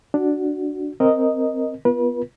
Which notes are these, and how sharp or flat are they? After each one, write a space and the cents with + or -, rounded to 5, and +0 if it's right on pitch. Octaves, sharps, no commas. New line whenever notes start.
D4 +0 F#4 +0
C4 +0 A#4 +0 D#5 +0
B3 +0 F4 -15 B4 -40